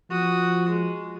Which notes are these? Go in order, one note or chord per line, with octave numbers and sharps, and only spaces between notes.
F3 F#4 D#6
G#3